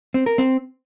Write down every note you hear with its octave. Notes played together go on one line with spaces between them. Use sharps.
C4
A#4
C4